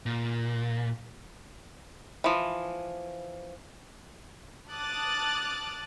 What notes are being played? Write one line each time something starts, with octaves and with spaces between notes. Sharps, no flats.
A#2
E3 F3
A5 D6 D#6 F6 F#6 A6